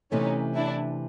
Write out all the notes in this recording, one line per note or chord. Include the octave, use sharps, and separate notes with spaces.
C3 E3 A3 C#4 D#4
D4 E4